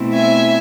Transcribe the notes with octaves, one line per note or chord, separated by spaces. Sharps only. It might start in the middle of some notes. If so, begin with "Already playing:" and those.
Already playing: B2 A3 C4 E4
E5 G#5